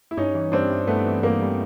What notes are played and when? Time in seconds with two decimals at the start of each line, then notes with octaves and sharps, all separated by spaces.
0.11 E4
0.17 G2 C#4 D#4
0.35 E3
0.52 G2 C4 D4
0.70 G3
0.87 G2 A3 B3
1.05 E3
1.23 G2 A#3
1.41 G3